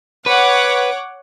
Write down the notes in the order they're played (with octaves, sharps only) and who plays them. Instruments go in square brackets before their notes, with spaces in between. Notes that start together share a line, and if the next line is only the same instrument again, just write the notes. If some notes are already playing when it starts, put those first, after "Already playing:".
[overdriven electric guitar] B4 [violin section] C#5 F#5 D6